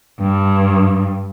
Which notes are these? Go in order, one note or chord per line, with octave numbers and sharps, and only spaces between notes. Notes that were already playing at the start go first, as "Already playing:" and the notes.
G2